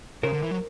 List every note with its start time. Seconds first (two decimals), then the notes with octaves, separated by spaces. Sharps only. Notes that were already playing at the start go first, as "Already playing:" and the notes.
0.23 C#3 A#4 C5
0.33 D3
0.42 E3
0.51 F#3